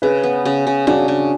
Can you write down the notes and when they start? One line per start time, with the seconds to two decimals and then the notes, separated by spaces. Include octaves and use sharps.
0.02 C#3 G#4 B4
0.23 B3
0.45 C#3
0.67 C#3
0.87 C#3 D4 F#4
1.08 C#3